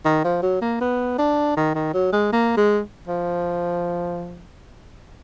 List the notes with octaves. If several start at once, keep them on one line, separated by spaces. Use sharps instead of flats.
D#3
F3
F#3
A#3
B3
D4
D#3
D#3
F#3
G#3
A#3
G#3
F3